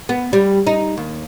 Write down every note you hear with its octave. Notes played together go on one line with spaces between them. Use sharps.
B3
G3
D#4
D#2